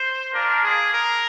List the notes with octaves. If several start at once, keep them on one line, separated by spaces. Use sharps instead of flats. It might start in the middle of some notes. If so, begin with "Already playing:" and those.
Already playing: C5
A#3 D4 F4 A#4
G#4
A#4